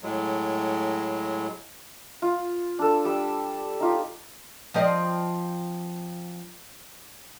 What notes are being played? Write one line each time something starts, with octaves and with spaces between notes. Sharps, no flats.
A2 F#3 G#3
F4
D4 A4
G3 E6
D#4 F4 G4
F3 C4 D#5